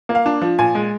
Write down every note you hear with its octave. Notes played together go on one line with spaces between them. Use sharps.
A#3
F5
D4
F3
A#2 G#5
G#3